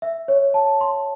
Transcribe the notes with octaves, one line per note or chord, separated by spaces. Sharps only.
E5
C#5
A5
C6